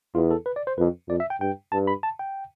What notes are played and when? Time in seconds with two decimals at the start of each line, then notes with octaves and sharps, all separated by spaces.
0.14 E2 F4
0.31 A4
0.46 B4
0.56 D5
0.67 C5
0.78 F2 B4
1.09 F2 D5
1.20 E5
1.30 G5
1.41 G2 G5
1.72 G2 A5
1.87 B5
2.03 A5
2.19 G5